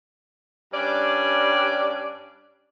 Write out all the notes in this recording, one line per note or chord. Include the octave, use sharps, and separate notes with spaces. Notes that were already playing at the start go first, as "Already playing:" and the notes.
G2 C#4 D4 D5